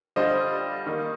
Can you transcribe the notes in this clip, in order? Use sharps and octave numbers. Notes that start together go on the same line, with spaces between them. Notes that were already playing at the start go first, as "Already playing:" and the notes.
D3 G3 D4 F4 C5 D#5
D#3 A#3 D#4